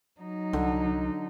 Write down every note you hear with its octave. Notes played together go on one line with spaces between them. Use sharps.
F#3 D#4
C2 D3